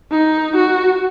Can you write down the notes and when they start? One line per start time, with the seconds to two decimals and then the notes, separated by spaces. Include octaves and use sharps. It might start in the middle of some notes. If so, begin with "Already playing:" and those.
0.11 D#4
0.56 F#4